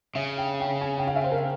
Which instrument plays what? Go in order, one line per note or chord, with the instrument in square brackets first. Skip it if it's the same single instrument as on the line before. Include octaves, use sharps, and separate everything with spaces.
[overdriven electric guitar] C#3 [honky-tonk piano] E5
[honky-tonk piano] G5
G5
G#5
G5
F5
E5
C5
A#4